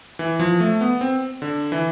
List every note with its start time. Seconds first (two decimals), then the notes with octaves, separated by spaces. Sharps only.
0.19 E3
0.39 F3
0.60 A3
0.81 B3
1.01 C4
1.42 D3
1.72 E3